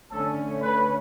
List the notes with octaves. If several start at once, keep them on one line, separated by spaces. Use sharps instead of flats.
D3 A3 C#4 A4
B4